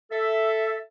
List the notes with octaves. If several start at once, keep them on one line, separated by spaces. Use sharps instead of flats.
A4 E5